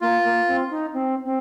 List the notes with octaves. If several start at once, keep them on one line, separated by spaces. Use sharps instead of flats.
A#3 F4
A#3
C4
D#4
C4
C4